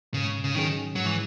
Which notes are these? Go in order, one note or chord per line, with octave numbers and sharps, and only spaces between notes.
G#2 C#3
C#3
D#3 F#3 C#4 G#4
G#2 F#3
E3